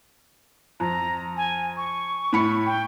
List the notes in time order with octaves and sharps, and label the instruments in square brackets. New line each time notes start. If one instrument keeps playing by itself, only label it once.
[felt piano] F2 [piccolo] A#5
[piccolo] G#5
C#6
[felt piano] A2 B5 C#7
[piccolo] G5